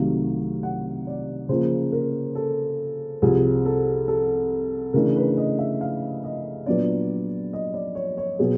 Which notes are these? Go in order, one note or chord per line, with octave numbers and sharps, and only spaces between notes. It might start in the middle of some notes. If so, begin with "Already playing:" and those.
Already playing: C2 C3 D#3 F#3 A3 F5
F#5
D5
C#3 F3 A#3 C5
A#4
A4
C2 C3 F3 G#4
A4
A4
C#3 E3 A3 D4 A#4
B4
D#5
E5
F5
D#5
A#2 F#3 B3 D4 D5
D#5
D5
C#5
C#5
B2 F#3 B3 G#4